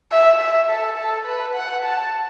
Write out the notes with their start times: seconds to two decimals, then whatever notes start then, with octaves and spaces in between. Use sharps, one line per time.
0.12 E5
0.41 E5
0.69 A4
0.98 A4
1.26 B4
1.55 F#5
1.84 A5